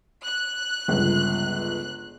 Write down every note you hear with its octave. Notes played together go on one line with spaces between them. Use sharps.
F#6
G1 C#2